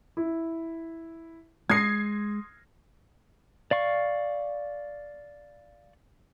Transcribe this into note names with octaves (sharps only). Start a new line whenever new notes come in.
E4
G#3 C6 D#6 G#6 A#6 C7
D5 F5 C#6